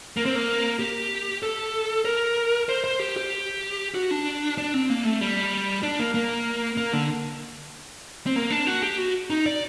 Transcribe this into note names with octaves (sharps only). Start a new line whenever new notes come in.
A#3
C4
A#3
G4
A4
A#4
C5
C5
G4
G4
F#4
D4
D4
C4
A#3
A3
G3
D4
A#3
A#3
A#3
D3
C4
A#3
D4
F#4
G4
F#4
D#4
D5